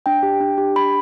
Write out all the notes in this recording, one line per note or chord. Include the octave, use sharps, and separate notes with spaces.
D4 G5
G4
D4
G4
D4 B5